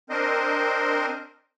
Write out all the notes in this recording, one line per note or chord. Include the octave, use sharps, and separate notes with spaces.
C4 D4 A#4 C5 D#5